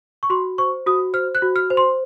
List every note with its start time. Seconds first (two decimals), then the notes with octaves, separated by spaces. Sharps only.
0.23 C#6
0.30 F#4 C6
0.58 C5 C#6
0.86 F#4 D#6
1.14 C5 F6
1.35 F#6
1.42 F#4
1.56 F6
1.70 C5
1.77 C6